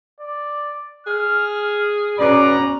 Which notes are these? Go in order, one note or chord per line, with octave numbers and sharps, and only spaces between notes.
D5
G#4 F6
B2 B3 C#4 D5 A#5